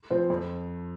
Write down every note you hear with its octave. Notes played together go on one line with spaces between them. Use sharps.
F3 C4
F2